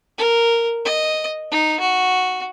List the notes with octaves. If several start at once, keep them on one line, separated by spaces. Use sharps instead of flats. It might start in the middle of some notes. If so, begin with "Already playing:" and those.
A#4
D#5
D#4
F#4